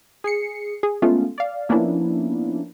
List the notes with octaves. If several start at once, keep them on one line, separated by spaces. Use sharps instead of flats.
G#4 C7 C#7
G#4
G#3 A3 B3 C#4 F4
D5 F5
F3 A#3 B3 C#4 D4 E4